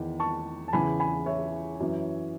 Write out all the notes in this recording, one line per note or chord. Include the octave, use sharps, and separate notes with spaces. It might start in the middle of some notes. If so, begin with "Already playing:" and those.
Already playing: E2 D#3
A5 C#6
A5
E2 C#3 E3 G#5 B5
G#5 B5
C#5 E5
F#2 E3